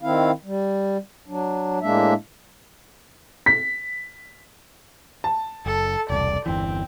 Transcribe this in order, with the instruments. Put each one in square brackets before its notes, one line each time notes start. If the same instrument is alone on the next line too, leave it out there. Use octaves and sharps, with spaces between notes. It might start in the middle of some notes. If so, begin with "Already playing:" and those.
[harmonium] D#3 C4 E4 F5
G3
F#3 D4
A2 G#3 A#3 D4 E5
[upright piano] B6
[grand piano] A5
[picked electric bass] F#1 [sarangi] A4
[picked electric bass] E1 C2 [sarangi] D5
[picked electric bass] G1 E2 E3 [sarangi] C4